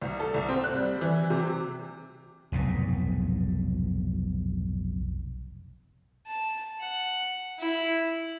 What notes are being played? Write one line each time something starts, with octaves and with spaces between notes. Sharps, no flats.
C2
A4
C2
C4
F#6
G3
E3
C3
F1 B1 G#2
A5
F#5
E4